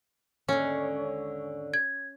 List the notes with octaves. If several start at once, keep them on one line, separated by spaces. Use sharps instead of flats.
D#2 G#2 D3 C#4
G#6